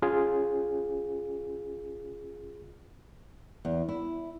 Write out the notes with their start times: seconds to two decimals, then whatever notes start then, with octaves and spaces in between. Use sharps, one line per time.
0.02 C#4 F4 G#4
3.65 E2
3.89 E4